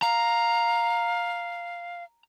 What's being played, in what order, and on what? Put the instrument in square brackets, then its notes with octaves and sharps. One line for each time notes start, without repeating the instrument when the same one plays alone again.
[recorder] F5 [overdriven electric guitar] A#5